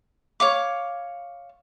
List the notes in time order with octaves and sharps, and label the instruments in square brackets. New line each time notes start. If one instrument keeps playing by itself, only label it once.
[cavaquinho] C#5 F5 D6